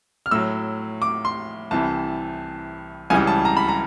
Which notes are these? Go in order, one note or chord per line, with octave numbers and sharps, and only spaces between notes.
F6
A2 F#3 E6
D6
C6
C2 C3 E3 A5
C#2 C#3 E3 G3 G#5
A5
A#5
B5
A#5